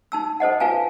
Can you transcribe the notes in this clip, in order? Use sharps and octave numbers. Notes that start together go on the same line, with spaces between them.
D#4 A5 E6
A4 C5 D#5 F#5
F4 B4 F5 G#5 A5